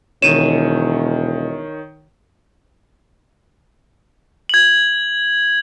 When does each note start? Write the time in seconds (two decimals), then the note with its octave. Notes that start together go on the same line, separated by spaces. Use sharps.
0.22 E1 D#3 C#5 D#7 E7
4.49 G#6 F#7